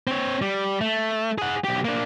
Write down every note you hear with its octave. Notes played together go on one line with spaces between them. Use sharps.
C4 C#5
G3
A3
G#4 F#5
B1 G4
A#3 D4